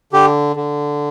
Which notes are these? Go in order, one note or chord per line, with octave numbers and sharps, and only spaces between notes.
D3 G4
D3